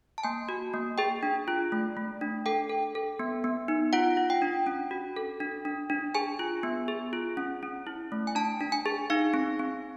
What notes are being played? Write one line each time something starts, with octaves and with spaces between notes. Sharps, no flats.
A5
A#3 G#5
F#4
A#3
G#4 G5
D4
F4
A3
A3
D4
A4 G5
A4
A4
B3
B3
D#4
F4 F#5
F4
G5
D4
C#4
F#4
A4
D4
D4
D4
G#4 G#5
F4
B3
G#4
F4
C#4
C#4
E4
A3
G#5
D4 A5
D4
G#5
G#4
D#4 F5
C4
C4